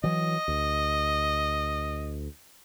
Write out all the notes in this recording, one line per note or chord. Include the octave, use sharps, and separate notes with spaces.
E3 F#3 D#5
D2